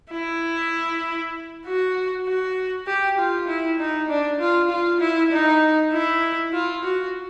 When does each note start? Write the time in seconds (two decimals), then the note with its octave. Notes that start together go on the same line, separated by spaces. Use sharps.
0.12 E4
1.65 F#4
2.27 F#4
2.87 G4
3.18 F4
3.48 E4
3.79 D#4
4.09 D4
4.40 F4
4.70 F4
5.00 E4
5.32 D#4
5.92 E4
6.53 F4
6.84 F#4